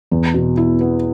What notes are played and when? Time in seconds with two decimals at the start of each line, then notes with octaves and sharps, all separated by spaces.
0.11 E2
0.34 B2
0.57 E4
0.81 B3